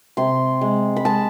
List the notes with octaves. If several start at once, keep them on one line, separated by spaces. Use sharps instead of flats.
C3 C6
G#3
B5
G#3 A5